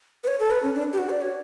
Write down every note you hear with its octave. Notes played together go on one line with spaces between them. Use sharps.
B4
C#5
A4
B4
C#4
D4
G4
F#4
D5
C#5